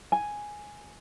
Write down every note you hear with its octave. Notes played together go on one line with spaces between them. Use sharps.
G#5